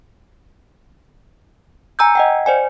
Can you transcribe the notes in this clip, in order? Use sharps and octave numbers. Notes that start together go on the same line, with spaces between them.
G#5 A#5 E6 G6
D#5 F#5 G5
C5 D5 G#5